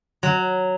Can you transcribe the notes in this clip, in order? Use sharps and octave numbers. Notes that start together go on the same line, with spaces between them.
F#3